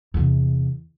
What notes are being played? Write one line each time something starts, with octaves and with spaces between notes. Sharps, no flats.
E2 C3